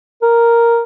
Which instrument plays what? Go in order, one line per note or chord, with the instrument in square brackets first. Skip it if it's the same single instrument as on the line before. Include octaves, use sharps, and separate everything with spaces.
[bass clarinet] A#4